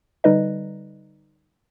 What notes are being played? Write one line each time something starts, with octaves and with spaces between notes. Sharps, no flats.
D3 G3 D#4 B4 D#5